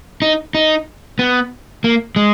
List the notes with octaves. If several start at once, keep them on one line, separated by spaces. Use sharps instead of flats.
D#4
D#4
B3
A#3
G#3